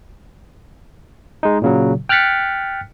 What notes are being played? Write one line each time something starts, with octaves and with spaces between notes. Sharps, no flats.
G#3 D#4
A#2 C#3 F#3
G5 F6 F#6 A6 B6 C#7